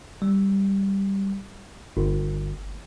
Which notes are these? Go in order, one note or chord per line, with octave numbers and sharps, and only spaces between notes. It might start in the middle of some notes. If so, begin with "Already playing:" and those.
G3
G1